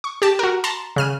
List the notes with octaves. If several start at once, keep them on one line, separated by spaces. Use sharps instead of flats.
C#6
G4 A5
F#4 A#4
A5 A#5 C6
C#3 F6 D#7